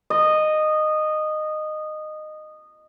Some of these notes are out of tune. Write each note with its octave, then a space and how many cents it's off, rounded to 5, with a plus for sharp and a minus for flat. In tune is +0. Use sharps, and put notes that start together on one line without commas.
D#5 -15